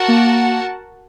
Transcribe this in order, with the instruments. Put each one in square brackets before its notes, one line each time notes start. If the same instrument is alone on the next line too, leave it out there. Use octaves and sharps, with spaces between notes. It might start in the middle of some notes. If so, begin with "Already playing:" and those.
Already playing: [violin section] F#4 A#4 F#5 A5
[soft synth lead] A#3